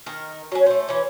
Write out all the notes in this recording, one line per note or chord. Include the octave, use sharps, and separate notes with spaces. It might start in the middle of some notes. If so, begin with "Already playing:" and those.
D#3 A#4
F#3 C#4
A3 C5
E3 C#4